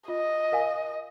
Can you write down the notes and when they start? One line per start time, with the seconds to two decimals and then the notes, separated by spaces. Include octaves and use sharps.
0.08 F4 D#5
0.52 A#4 F5 G#5